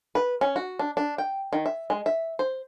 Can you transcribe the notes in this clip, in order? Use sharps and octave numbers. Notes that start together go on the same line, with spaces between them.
B4
C#4
F#4
D4
D4
G5
D#3
E5
G#3
E5
C5